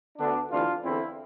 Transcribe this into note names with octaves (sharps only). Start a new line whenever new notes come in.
D2 D3 B3 D4
D2 C3 E3 D4 F4
E2 D3 C4 E4